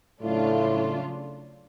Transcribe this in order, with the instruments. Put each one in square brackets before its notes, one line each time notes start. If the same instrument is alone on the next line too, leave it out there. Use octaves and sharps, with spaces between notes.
[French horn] A2 [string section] C#3 F#3 A3 D4 F4